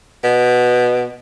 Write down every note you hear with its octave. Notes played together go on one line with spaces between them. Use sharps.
B2